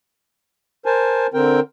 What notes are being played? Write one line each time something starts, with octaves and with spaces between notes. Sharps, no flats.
A#4 C5 G#5 A5
D3 C4 A#4 G5